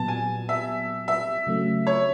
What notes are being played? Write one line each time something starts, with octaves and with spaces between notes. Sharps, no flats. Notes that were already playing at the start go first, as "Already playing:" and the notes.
Already playing: A#2 F#3 B3 A5
G#5
E5
E5
C#3 F#3 A3 C#4
C#5